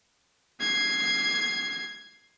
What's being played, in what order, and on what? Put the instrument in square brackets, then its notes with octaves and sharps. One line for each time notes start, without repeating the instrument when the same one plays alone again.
[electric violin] G#6 C7